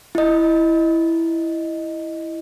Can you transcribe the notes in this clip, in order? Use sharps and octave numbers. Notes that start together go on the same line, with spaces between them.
E4 D#5